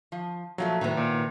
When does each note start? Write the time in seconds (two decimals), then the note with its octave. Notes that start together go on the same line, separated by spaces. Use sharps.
0.12 F3
0.58 A#2 F3 F#3 A3
0.81 A2 C3 D#3 B3
0.97 A#2